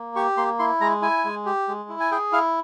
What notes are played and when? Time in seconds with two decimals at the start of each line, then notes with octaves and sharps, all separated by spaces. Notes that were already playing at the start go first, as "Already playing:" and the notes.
Already playing: A#3
0.16 G4 C#6
0.37 A#3 C6
0.59 E4 C6
0.80 G#3 A#5
1.02 E4 G#5
1.25 G#3
1.46 G4
1.68 G#3
1.89 E4
2.00 G#5
2.11 G#4 G5
2.32 E4 F5